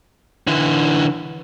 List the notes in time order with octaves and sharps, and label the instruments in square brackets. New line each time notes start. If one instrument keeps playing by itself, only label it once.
[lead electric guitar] D3 E3